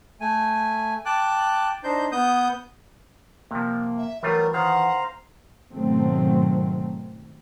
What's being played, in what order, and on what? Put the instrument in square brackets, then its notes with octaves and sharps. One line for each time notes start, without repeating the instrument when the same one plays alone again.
[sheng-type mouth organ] A3 G#5
G5 A5 D6 F#6
D4 D#4 C5 G6
B3 D#6 G6
[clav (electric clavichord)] C3 F3 [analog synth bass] A#3
[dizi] E5
[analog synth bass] E3 [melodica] F#3 [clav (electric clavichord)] G3 A3 F4 [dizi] A#4
[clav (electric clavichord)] D#3 [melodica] C5 F5 A#5 [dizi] F#5
[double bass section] G#2 B2 D#3 F#3 A3 C4